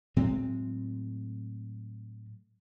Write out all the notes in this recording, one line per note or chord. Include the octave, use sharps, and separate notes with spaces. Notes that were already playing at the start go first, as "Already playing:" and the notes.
A2 F#3 G#3 C4